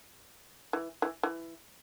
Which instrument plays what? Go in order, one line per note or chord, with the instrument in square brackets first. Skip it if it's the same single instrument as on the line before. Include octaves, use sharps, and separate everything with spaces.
[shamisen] E3
E3
E3